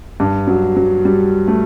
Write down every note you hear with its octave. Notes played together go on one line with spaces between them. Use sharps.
G2
F#3
F#3
G3
A3